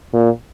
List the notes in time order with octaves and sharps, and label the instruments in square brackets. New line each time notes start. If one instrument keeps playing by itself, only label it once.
[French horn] A#2